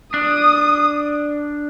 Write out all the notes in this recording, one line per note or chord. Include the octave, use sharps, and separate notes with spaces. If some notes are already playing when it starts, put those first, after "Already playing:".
D4 D#6